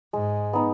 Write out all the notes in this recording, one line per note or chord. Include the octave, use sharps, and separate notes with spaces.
G#2 G#3
B3 D#4